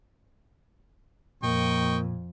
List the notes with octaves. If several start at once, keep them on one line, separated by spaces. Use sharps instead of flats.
F2 A#2 A#3 D#5 G5 C#6